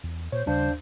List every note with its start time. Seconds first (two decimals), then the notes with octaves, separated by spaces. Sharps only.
0.03 E2
0.32 A#2 C5 C#5
0.46 D#2 C#3 G3 D4 C5 F5